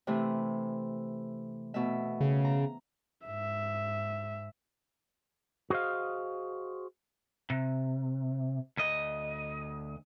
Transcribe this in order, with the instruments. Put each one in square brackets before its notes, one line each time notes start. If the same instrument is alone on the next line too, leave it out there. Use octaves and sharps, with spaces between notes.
[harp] C3 E3 A3
B2 A3 E5
[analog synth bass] C#3
[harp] A#5
[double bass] G#2 [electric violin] E5
[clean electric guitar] F#4 G#4 C5 D#5 F5
[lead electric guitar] C3
D2 D#5